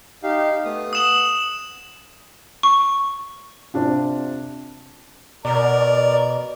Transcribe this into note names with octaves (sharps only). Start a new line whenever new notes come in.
D#4 G4 F5
A3 B3 D#6
F#5 D#6 E7 F#7
C#6
C3 D4 F4
B2 A#4 D5